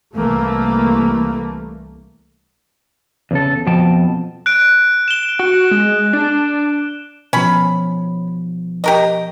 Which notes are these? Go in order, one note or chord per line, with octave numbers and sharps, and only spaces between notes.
C2 E3 A3 A#3
E2 C#3 A4
F2 B2 F3 G5 A5
F#6 D7
E7 G7
F#4
G#3
D4
B2 E3 F3 C#4 B5
G4 A#4 D#5